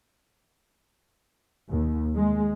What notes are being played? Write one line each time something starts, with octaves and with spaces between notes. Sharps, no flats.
D#2
G#3